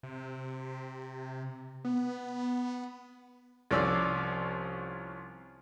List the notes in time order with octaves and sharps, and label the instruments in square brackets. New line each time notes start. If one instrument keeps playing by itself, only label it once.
[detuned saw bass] C3
B3
[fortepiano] C2 F3 C#4 D5 E6